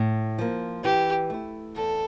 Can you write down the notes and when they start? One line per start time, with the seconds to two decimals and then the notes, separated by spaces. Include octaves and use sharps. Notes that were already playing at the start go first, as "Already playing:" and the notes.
Already playing: A2
0.38 F3 A#3
0.84 E3 G4
1.30 A3 E4
1.76 E2 A4